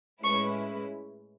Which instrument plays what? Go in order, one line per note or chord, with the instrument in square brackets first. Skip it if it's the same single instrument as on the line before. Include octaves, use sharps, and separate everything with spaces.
[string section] A2 G#3 C#4 E4 B4 [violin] C#6